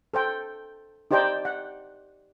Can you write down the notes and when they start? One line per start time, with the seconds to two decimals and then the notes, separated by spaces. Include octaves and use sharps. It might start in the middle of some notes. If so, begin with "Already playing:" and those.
0.14 A4 C5 G5
1.11 D#4 G4 C5 D5 G5 A5
1.45 F#5